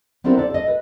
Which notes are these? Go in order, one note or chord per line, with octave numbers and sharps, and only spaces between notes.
B3 C4 D4 E4 A4 A#4
A4 C5 D5
A4 D#5
B4